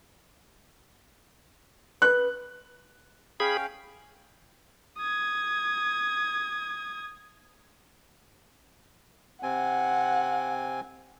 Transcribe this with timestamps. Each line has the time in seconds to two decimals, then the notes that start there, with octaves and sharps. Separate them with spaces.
2.02 B4 F#6
3.40 C#4 G#4 F5 G5 B5
4.98 D#6 G#6
9.43 C3 C4 F#5 G#5